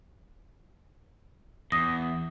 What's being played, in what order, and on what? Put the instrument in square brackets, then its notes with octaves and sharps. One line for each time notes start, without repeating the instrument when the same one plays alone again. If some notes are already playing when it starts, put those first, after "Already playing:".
[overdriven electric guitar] E2 [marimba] D#6 A#6